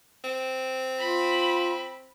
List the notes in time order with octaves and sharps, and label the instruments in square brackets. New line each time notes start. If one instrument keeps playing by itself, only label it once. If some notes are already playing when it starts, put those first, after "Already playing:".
[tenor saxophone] C4
[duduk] F4 [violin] B5